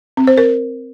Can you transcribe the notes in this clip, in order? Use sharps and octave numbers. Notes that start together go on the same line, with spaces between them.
C4
C5
A#4